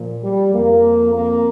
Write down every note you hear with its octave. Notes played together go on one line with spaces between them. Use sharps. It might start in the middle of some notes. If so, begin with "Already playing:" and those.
Already playing: A#2 F3
G3
F2 F3 A#3
A#3